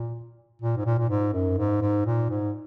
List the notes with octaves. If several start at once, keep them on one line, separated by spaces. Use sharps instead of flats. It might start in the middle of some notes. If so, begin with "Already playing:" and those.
Already playing: A#2
A#2
G#2
A#2
A#2
G#2
F#2
G#2
G#2
A#2
G#2